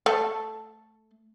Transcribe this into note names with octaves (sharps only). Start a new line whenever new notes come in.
A3 A4